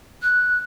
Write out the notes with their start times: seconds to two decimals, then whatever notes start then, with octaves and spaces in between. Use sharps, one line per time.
0.22 F#6